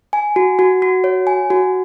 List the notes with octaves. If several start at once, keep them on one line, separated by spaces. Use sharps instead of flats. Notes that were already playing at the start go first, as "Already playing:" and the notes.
G#5
F#4
F#4
F#4
C#5
G#5
F#4